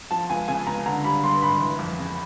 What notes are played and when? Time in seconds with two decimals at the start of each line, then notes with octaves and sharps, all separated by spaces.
0.11 F3 A5
0.30 C#2 G#5
0.48 C#3 G#5
0.67 C#2 A#5
0.86 D3 A#5
1.04 G3 B5
1.24 G2 C6
1.42 G#1 B5
1.60 E3
1.79 F2
1.99 C#3